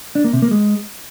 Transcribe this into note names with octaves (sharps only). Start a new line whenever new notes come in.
D4
A#3
C3
A#3
G#3